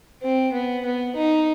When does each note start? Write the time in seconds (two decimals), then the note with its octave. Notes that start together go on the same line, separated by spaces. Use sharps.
0.23 C4
0.53 B3
0.85 B3
1.16 D#4